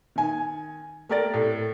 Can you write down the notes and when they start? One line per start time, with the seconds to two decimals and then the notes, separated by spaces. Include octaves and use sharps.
0.16 D#3 G#5
1.09 A3 G4 A#4 D5 A6
1.34 A2